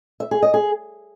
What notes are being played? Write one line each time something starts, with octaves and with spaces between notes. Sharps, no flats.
E5
G#4
D#5
G#4